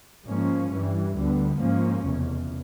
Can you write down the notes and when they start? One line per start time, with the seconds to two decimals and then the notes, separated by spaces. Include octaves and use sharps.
0.24 G#2 F3 A#3 C#4
0.69 G2 E3 G3
1.14 D2 D3 G3 B3
1.59 G#2 F3 A#3 C#4
2.04 F1 E2 C#3